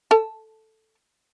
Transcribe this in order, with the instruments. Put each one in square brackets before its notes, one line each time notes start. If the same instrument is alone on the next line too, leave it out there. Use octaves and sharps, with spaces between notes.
[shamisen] A4 A5